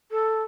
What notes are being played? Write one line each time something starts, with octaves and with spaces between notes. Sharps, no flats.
A4